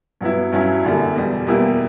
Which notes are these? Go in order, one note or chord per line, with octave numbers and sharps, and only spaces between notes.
G2 F#3 B3 E4
G2 F#3 C#4 E4
F#2 D3 G3 A#3
E2 B2 G3
E2 B2 G3 A#3 E4